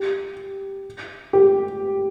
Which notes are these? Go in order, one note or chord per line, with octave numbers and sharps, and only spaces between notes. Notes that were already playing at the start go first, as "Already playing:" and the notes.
Already playing: G4
G4